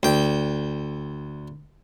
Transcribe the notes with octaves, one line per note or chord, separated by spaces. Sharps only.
D2 G5